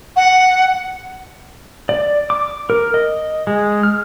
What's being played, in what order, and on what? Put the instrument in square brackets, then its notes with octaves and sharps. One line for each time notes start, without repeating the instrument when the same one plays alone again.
[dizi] F#5
[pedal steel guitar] D5
D6
A#4
D#5
G#3
F6